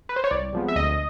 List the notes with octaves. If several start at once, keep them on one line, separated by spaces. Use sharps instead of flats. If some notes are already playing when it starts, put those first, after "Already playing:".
B4
C5
C#5
C2 D5
C3 F3 G#3 B3
E5
D2 D#5